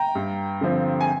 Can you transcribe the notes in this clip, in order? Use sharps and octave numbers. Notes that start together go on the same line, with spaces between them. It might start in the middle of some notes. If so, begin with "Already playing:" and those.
Already playing: G5 A#5
G2
D3 F3 C4
G#5